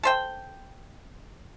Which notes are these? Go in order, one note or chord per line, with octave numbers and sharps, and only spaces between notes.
A4 C5 G5